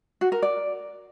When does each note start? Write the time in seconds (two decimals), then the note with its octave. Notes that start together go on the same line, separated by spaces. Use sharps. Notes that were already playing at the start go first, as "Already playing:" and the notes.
0.21 F#4
0.32 A#4
0.42 D5